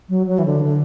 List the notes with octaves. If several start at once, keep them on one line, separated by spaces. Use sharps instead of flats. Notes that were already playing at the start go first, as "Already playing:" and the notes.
F#3
F#3
E3
D3
D3